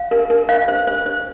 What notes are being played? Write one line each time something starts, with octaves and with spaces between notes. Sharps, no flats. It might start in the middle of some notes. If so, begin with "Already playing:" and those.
Already playing: F5
A#4
A#4
F5
C5
C5
C5